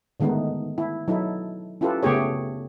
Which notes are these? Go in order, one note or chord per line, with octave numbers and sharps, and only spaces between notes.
D3 D#3 G#3 A3 B3 D#4
E4
F#3 D#4 E4 A4
C#4 E4 F4 G4 A4 B4
C#3 A3 B3 G4 G#4 C#5